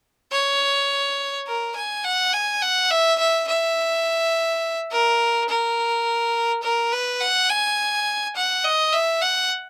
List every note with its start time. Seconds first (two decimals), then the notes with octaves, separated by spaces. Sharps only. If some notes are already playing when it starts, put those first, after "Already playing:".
0.32 C#5
1.47 A#4
1.76 G#5
2.04 F#5
2.33 G#5
2.62 F#5
2.91 E5
3.19 E5
3.48 E5
4.91 A#4
5.49 A#4
6.63 A#4
6.92 B4
7.21 F#5
7.50 G#5
8.36 F#5
8.64 D#5
8.93 E5
9.22 F#5